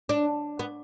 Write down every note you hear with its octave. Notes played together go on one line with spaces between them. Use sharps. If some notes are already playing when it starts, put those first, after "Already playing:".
D4
B3